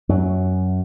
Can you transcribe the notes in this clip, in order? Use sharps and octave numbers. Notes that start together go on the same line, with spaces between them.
F#2 F#3